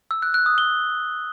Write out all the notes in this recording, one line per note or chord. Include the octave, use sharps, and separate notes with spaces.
E6
F#6
F#6
D#6
G7